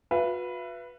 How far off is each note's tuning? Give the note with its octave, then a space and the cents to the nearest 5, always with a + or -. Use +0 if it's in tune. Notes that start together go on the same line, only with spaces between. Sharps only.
F#4 -40 B4 -5 E5 +40